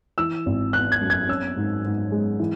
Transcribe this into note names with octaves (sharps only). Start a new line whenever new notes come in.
E3 E6
G#1
B3 F#6
G#6
F#2
G#6
C#4 E6
G#2
G#2
G#3
E3